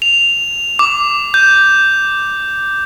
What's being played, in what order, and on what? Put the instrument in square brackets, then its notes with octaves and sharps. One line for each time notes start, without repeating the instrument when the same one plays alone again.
[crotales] F7
D6
G6